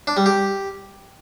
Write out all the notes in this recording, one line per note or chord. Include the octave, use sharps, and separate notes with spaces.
D4
G3
G4